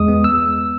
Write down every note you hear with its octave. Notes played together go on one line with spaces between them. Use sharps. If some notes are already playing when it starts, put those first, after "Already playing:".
Already playing: E2 G#3 D#6
B3
E6